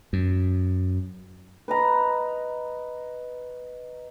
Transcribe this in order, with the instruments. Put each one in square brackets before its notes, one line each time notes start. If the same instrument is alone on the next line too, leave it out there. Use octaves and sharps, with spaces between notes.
[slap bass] F#2
[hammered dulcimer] B4 D#5 A#5